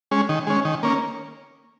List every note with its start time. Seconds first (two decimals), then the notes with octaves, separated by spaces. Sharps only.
0.11 G#3 C#4
0.29 D#3
0.47 G#3 C#4
0.65 D#3
0.83 A#3 C#4